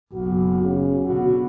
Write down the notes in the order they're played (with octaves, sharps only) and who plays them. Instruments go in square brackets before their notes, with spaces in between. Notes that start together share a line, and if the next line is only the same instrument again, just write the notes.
[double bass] F#1 B1 [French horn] F#4
[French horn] C#3
[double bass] B2 D3 [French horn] F#4